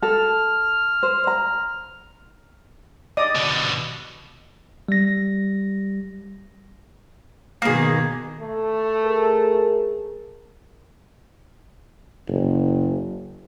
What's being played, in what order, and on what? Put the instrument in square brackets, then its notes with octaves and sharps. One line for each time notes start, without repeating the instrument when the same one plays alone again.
[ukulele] A4 [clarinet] F6
[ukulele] C5
A#5
[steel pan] D5 D#5 D#6
[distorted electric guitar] B2 D3
[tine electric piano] G3 A#6
[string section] B2 D#3 [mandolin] A#3 G#4
[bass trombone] A3
[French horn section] G#4 A#4
[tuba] F#1